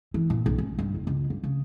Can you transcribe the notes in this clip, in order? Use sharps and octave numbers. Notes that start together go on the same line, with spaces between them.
E3
A#2
B1
C#4
G2
F#1
C#2
G2
C#3